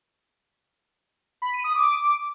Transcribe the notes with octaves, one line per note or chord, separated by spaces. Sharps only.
B5
D#7
D#6
D6